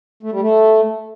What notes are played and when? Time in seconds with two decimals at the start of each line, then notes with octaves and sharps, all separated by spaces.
0.23 A3
0.32 G3
0.41 A3